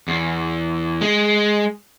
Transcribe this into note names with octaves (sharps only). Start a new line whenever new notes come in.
E2
G#3